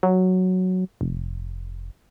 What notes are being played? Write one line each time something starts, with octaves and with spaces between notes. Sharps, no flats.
F#3
F1